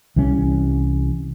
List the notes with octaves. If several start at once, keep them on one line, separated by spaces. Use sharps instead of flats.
C2 E3 G3 C#4